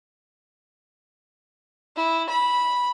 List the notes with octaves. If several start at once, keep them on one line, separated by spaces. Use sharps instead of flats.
E4
B5